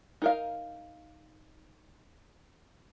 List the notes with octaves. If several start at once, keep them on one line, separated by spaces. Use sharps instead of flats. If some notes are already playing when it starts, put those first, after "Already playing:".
D#4 A#4 F5